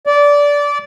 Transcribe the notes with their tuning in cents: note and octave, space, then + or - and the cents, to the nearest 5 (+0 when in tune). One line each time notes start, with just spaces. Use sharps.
D5 -20